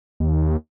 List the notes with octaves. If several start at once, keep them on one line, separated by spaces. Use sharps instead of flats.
D#2